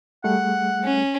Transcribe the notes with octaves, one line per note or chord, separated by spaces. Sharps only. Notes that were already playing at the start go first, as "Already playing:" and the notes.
G3 A3 G#4 F#5
C#4